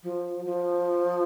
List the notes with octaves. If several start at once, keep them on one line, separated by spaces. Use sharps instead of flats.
F3
F3